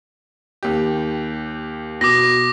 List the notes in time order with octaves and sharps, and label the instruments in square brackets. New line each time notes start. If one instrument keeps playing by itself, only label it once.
[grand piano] D#2 G4
[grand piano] B2 [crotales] D6 A#6